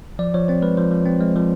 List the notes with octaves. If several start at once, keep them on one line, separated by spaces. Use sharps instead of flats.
F3 D5
F3 C#5
C4 C5
G#3 B4
F3 C5
F3
C4
G#3
F3